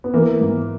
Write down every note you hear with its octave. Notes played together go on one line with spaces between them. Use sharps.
B3
E3 A#3
G#2